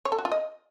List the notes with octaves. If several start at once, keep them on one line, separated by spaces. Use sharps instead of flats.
C#5
A4
F#4
F4
D#5